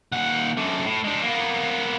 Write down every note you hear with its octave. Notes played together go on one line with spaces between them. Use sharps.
D#2 F#5
F#2 D3
A2
G#3 D4
A#3 B3